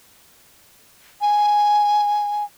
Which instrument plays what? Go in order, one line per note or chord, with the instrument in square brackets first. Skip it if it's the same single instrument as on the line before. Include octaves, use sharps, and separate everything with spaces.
[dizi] G#5